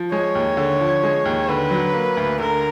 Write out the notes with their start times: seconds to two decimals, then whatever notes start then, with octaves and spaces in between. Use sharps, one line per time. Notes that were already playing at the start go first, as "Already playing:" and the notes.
Already playing: F3
0.12 G#3 C#5
0.35 D#2
0.57 D3
0.81 F3
1.03 G#3
1.25 D#2
1.49 D3 B4
1.71 F#3
1.94 A#3
2.17 D2
2.40 D3 A#4